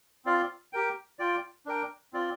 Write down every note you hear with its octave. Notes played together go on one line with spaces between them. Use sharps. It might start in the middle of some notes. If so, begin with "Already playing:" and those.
C4 F4 D5 F5
G4 A#4 G5
F4 D5 G5
D4 A#4 G5
C4 F4 D5